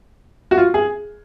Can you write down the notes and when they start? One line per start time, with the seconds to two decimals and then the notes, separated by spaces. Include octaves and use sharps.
0.51 F#4
0.58 F4
0.74 G#4